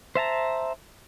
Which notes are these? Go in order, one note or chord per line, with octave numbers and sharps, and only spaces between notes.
C5 E5 A5 A#5